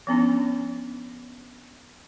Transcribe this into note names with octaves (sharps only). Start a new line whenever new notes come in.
F3 B3 C#4 D4